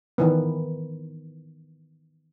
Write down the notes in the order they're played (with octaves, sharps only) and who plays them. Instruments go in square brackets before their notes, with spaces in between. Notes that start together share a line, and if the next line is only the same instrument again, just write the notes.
[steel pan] D#3 E3 B3